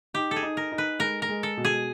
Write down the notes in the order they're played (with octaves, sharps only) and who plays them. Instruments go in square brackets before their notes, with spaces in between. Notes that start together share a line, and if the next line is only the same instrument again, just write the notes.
[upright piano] D#4 [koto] G4
[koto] A4
G#4
[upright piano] D#4
[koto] A#4
[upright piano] D#4
[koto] B4
[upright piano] G#3 [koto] A#4
[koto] A#4
[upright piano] G#3
[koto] A4
[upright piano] B2
[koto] G#4